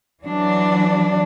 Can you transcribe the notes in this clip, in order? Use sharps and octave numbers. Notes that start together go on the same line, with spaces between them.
E3 F#3 D4